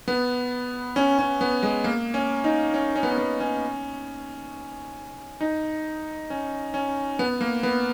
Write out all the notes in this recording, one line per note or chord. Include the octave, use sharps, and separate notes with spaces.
B3
C#4
C#4
B3
G#3
A#3
C#4
D#4
C#4
C#4
B3
C#4
B3
C#4
D#4
C#4
C#4
B3
A#3
B3